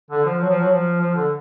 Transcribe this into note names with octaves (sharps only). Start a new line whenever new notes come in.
D3
F3
F#3
F3
F#3
F3
F3
D3